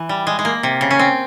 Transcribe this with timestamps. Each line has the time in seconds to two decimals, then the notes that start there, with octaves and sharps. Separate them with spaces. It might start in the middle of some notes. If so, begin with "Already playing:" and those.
Already playing: E3
0.09 G3
0.27 G#3
0.39 G#3
0.45 A#3
0.63 C3
0.81 C#3
0.91 C#4
0.99 C4